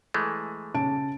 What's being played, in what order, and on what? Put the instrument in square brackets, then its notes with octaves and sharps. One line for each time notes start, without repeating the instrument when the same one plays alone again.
[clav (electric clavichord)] E3 G#3 A3
[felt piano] C#3 A5 D7